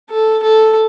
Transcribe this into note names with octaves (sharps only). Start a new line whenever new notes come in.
A4
A4